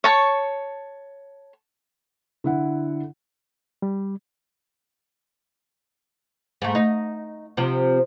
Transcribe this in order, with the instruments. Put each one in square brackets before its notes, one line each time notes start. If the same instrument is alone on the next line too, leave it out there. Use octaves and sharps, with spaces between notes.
[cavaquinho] C#5 A5 C#6
[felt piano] D3 E4 F#5
[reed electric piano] G3
[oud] G#2 A3
D#4
C3 F3